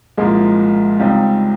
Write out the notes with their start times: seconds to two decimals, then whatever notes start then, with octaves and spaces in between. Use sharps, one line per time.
0.17 C2 A#2 F3 G#3 A#3
0.99 C#2 C3 G3 C4 D#4